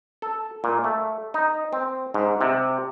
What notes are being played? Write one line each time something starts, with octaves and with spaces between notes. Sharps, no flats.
A4
A#2
A3
D#4
C4
G#2
C3